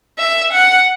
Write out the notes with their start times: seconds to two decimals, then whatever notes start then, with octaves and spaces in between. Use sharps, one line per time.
0.19 E5
0.53 F#5